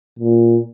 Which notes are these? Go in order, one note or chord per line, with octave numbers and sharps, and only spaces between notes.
A#2